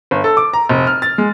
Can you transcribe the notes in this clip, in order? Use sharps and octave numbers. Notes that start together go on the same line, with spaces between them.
G1
A4
D6
A#5
F1
F6
A6
G#3